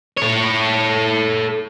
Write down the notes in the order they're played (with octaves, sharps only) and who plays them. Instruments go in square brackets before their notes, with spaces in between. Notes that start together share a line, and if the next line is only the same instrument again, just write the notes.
[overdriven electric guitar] A4 C#5